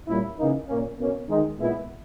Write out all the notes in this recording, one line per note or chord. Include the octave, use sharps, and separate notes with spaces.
A#2 G3 A#3 C#4 E4
C#3 E3 A#3 D#4
A#2 A#3 C#4
B2 A#3 C#4
D#3 G#3 D#4
A#2 G#3 B3 E4